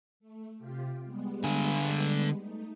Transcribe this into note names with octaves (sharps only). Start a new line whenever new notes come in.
A3
C3 F4 G4
G3 G#3 B3
D3 G#5
A3 D#4